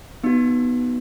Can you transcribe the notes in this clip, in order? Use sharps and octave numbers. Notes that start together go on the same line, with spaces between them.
B3 D#4 F#4